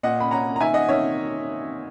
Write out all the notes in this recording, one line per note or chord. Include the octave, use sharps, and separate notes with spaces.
A#2 D#5 F#5
B5
C#4 F#5 A#5
A#5
D#3 E5 G#5
D#5 F#5
D#3 C#5 E5